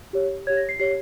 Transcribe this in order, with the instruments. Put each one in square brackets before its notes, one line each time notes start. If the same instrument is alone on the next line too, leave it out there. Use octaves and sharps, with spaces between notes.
[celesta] G4 C#5
G4 C#5 G#6
A#6
C7
G4 C#5 C7